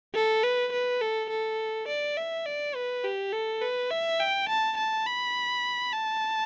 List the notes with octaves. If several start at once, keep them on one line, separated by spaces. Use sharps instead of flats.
A4
B4
B4
A4
A4
D5
E5
D5
B4
G4
A4
B4
E5
G5
A5
A5
B5
A5